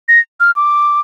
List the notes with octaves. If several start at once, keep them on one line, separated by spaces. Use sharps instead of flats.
A#6
F6
D6